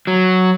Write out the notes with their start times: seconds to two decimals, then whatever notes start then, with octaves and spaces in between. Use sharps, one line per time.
0.07 F#3